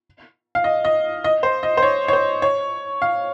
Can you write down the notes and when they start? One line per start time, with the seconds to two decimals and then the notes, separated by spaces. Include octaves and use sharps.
0.55 F5
0.64 D#5
0.85 D#5
1.24 D#5
1.43 C5
1.63 D#5
1.77 C5
1.83 C#5
2.08 C#5
2.13 C5
2.42 C#5
3.02 F5